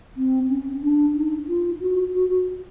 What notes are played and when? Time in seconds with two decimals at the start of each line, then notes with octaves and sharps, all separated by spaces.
0.17 C4
0.49 C#4
0.82 D4
1.15 D#4
1.48 F4
1.81 F#4
2.14 F#4
2.30 F#4